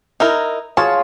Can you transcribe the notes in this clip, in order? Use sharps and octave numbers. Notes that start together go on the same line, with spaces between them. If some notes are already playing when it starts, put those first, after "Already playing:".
D#4 E4 A#4
F4 G#4 C#5 A5